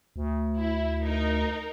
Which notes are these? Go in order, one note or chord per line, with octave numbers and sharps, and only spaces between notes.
D2
E4
D#4 A#4